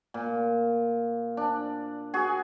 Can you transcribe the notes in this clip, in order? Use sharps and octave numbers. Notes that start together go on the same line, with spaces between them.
A#2
D4
F#4 G#4